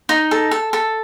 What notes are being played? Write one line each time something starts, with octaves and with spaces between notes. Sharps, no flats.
D#4
A4
A4
A4